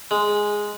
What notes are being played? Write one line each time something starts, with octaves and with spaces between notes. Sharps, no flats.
G#3